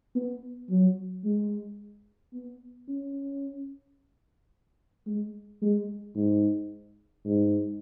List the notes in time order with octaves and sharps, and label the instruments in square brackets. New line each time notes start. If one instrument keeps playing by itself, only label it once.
[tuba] B3
F#3
G#3
B3
C#4
G#3
G#3
G#2
G#2